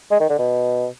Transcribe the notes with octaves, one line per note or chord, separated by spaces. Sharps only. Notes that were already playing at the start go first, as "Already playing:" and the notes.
G#3
D#3
D3
B2